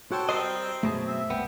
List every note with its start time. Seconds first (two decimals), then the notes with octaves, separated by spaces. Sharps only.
0.12 F#4 A4 C5 C#5 G5
0.29 G3 C4 A#4 C5 D#5
0.83 F#2 B2 A3 G#4 C5 A5
1.06 C4 E5
1.30 C2 B3 G5